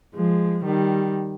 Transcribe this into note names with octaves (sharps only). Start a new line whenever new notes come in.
F3 G#3
D#3 G3